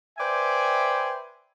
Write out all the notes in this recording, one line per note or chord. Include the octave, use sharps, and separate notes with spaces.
B4 C5 D5 E5 G5 G#5